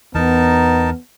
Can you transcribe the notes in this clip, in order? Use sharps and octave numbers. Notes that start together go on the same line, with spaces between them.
E2 B3 D#4 A#4 A5